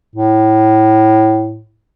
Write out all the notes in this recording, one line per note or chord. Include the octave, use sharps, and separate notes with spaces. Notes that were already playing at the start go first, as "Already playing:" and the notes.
A2